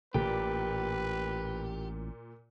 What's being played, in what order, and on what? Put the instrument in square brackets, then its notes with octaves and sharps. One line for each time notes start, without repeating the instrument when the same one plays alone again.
[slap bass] A1 [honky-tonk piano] A#2 [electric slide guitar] G4 [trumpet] B4